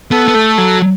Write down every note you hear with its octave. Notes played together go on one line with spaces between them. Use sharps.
B3 A4
B3
A3
F#3